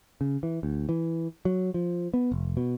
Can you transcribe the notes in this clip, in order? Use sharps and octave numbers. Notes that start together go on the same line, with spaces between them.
C#3
E3
D2
E3
F#3
F3
B3
F1
B2